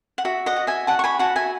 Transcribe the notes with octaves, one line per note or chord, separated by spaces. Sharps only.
F#5
F#4 E5
D#5 F#5
F#4
E5 G#5
F#4 F#5 A5
C#6
G#5 B5
F#4 F#5 A5
E5 G#5